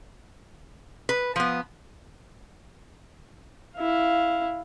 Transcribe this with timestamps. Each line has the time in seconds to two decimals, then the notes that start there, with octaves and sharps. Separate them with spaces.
1.09 B4
1.36 F3 B3
3.76 E4 F5